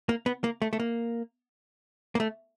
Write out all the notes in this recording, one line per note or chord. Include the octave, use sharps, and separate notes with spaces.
A#3
B3
A#3
A3
A3
A#3
A#3
A3